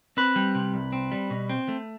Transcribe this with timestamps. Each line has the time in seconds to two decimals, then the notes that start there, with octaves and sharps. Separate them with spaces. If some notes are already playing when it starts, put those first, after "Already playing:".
0.17 C4 B4
0.36 G3
0.55 C3
0.74 C2
0.93 C4
1.12 G3
1.30 B2
1.49 C4
1.68 A3